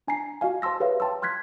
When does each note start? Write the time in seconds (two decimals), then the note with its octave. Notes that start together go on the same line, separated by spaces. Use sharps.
0.08 D4 G#5 A#5 C7
0.41 F#4 D#5 F5 G#5
0.62 C5 A5 C6 E6 A#6
0.80 G4 G#4 B4 C#5 E5 F5
1.00 G5 A5 C6 E6
1.22 C6 F6 F#6 G#6 B6